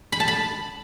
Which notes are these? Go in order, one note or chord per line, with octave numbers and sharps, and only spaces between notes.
B5
A5
B5